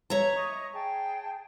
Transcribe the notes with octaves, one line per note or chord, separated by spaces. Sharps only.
C#5 E5 A#5
D#5 C#6 D#6
G#4 G5 A5